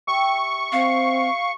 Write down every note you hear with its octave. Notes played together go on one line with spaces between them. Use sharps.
G4 E5 G5 C#6
C4 F5